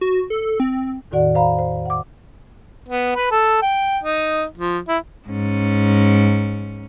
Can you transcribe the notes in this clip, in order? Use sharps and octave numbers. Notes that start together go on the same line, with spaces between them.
F#4
A4
C4
E2 A2 D#3 F#4 D5 F#5
C5 F5 A#5 B5
C5
F#5 D6
B3
B4
A4
G5
D#4
F3
E4
G#2 C#4